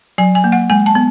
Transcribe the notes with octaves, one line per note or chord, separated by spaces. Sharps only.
F#3 G#5
G#5
A#3
F#5
G#3 G#5
A5
B3